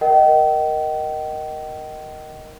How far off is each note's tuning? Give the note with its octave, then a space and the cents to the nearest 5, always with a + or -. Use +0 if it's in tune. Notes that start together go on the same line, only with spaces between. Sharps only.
A#4 +0 D#5 +0 G5 -40